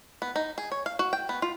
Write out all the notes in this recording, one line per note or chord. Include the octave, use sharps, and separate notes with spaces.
B3
D#4
G#4
C#5
F5
F#4
G5
B3
F4